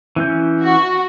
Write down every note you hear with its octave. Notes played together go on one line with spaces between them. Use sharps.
E3 C#4 G6
F#4